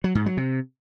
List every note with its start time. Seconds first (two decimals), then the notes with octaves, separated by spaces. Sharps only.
0.04 F#3
0.15 G#2
0.26 F#3
0.37 C3